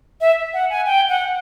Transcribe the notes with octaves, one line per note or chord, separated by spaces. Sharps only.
E5
F#5
G#5
G5
F#5